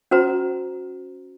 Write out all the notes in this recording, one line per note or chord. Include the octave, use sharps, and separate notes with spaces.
C#4 F#4 C5 A#5